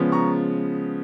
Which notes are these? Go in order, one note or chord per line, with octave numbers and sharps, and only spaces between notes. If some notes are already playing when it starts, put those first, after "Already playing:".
Already playing: C#3 F3 G#3 B3
A#5 C#6